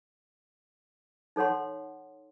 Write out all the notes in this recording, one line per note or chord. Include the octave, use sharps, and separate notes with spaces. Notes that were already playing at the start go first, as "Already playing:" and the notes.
D#4 A4 C#5 F#5 C6